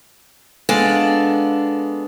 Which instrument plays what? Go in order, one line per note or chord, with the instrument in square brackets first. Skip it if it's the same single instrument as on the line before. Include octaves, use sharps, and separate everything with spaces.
[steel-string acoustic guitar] G#3 B3 D4 A4 F5